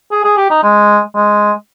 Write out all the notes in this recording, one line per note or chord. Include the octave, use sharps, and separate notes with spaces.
G#4
G#4
G4
D#4
G#3
G#3